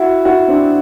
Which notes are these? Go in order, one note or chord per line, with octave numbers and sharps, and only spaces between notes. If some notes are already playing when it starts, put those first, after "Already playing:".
Already playing: E4 F#4
E4 F#4
C4 D4